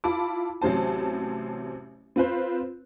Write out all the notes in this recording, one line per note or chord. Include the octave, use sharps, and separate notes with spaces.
E4 F4 A5 B5 D6
A1 C3 F#3 C5 A5
C4 F4 B4 C5